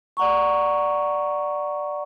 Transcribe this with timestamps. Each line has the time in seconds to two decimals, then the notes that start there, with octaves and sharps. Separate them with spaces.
0.17 D5 F#5 A#5 C#6